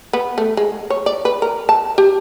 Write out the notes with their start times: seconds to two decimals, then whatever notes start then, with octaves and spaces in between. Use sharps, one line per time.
0.13 B3
0.38 A3
0.57 G#3
0.90 C#5
1.06 D5
1.25 B4
1.42 A#4
1.69 A5
1.98 G4